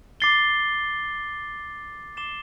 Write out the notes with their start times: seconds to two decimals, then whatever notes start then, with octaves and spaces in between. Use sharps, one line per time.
0.20 D6 A6 C7 G7
2.17 D6 A6 C7 E7 G7